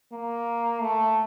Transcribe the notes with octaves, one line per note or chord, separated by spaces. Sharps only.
A#3
A3